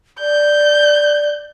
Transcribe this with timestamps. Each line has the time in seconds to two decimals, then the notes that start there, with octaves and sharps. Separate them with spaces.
0.20 D5 G6